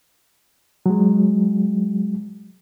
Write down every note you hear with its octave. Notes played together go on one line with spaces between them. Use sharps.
F#3 G#3